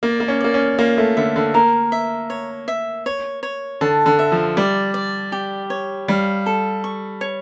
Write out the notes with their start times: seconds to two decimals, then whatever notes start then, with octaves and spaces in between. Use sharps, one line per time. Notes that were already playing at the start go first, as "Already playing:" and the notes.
0.03 A#3 D5
0.20 A#3
0.28 C#4
0.40 A#3 D5
0.54 C#4
0.79 A#3 F4
0.98 A3
1.17 D3 E5
1.36 D3
1.54 A#3 A#4
1.92 E5
2.30 C#5
2.68 E5
3.06 C#5
3.43 C#5
3.81 D3 A5
4.06 D3
4.19 E5
4.32 F3
4.57 G3 D5
4.94 D5
5.32 G4
5.70 C#5
6.08 G3 F5
6.46 A4
6.84 C#6
7.21 C#5